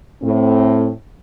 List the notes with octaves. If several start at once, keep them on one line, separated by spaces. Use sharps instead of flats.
A2 C4